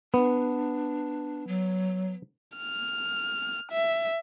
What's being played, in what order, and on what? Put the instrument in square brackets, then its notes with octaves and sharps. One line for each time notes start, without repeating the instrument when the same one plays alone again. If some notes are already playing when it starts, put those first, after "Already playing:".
[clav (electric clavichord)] B3 [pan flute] D4
[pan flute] F#3
[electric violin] F6
E5